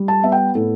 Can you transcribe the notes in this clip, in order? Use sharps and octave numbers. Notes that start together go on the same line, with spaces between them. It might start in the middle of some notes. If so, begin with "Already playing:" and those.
Already playing: G3
A5
B3 E5
G5
A2 A4